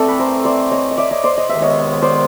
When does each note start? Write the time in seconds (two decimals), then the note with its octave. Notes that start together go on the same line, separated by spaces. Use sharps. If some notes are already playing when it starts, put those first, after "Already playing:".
Already playing: E3 A3 C4 A4 D5
0.08 B4
0.19 A#4 C5
0.45 C5 D5
0.71 C#5 D#5
0.91 D#5
0.98 D5 E5
1.11 C#5 D#5
1.24 C5 D5
1.38 D#5
1.49 C#2 C3 D#3 G#3 B3 E5
1.62 C#5 D#5
2.02 C5 D5